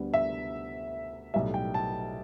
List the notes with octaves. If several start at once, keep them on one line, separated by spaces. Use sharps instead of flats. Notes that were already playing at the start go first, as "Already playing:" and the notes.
Already playing: D2 D3 G3 B3
E5
B1 A2 G3 E5
G5
A5